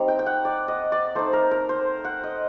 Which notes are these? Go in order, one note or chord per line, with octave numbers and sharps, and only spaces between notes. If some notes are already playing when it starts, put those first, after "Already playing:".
Already playing: G3 C4 D#4 A#5
G5
G5
F#5
D5
D#5
D5
A3 D#4 C5
A#4
A#4
C5
F#5
D#5